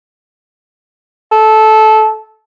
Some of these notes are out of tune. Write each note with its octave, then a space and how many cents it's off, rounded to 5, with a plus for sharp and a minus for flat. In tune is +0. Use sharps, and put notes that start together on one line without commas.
A4 -15